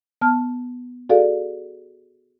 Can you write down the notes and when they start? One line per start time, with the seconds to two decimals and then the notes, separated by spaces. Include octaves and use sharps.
0.21 B3 A5 F6
1.09 F#4 G#4 A4 D5 F5